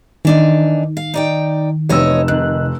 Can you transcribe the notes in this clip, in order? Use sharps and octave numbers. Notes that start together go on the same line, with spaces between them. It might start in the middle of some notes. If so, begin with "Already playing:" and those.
D#3 E3 D4 D#4
F5
D#4 D5 G5
F1 E2 C#5 D#5 E6
C3 D#3 F#6